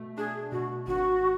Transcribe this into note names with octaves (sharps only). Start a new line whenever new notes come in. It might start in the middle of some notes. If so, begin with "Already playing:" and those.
Already playing: B2 A3
D4 G#4
B2 F#4
G#1 F#4